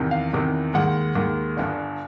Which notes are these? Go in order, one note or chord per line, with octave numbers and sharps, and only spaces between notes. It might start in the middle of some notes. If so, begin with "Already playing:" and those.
Already playing: E2 C3 D#3
F5
E2 C3 D#3
D#2 D#3 G#3 F#5
D#2 D#3 G#3
G1 G2 D3